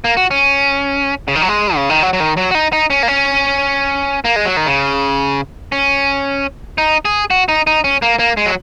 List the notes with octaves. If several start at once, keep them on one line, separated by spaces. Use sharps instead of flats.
A#3
F#4
C#4
C#3
D#3
F#3
G#3
C#3
D#3
F#3
F#3
D#3
F#3
F#4
D#4
D#4
C#4
A#3
C#4
A#3
G#3
F#3
D#3
C#3
C#4
D#4
G#4
F#4
D#4
D#4
C#4
A#3
A#3
G#3
F#3